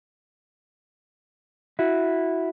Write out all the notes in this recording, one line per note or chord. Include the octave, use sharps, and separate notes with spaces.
E4 F#4